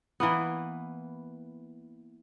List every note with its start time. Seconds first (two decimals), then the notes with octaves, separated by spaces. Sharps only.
0.20 E3 A#3 B3